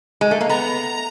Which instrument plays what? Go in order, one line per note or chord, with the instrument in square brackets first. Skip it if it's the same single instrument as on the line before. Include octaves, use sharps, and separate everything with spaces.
[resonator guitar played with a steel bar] G#3
A3
A#3
[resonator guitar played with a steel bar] B3 [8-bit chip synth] A#5